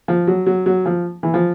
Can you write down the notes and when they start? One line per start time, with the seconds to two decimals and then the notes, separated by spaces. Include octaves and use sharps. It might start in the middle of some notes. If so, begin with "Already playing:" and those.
0.08 F3
0.27 F#3
0.46 F#3
0.66 F#3
0.86 F3
1.23 E3
1.34 F3